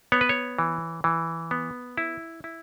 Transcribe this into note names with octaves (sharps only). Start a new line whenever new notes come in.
B3 C#5
B4
C#5
E3
E3
B3
E4
E4